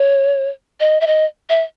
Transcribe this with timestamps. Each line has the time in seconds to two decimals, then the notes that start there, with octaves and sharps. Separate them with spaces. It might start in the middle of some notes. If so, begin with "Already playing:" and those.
Already playing: C#5
0.80 D#5
1.01 E5
1.07 D#5
1.50 E5